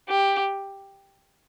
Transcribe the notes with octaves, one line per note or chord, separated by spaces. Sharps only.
G4